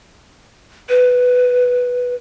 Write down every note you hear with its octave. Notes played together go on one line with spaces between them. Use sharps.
B4